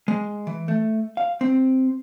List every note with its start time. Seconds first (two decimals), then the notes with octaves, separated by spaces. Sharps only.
0.08 G#3
0.47 E3
0.68 A3
1.17 F5
1.41 C4